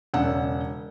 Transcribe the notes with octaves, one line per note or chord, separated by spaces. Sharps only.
E1 C#3 F#5 E6